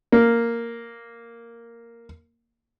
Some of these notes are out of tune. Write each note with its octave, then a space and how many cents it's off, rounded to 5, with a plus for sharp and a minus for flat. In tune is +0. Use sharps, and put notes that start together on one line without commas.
A#3 -5